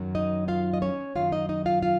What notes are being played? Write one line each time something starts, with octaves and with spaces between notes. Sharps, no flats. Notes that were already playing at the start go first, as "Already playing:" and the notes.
Already playing: F#2 D#3 F#3
D#4 D#5
F4 F5
D#5
C#4 C#5
F#2 D#3 F#3 F4 F5
D#4 D#5
D#4 D#5
F4 F5
F4 F5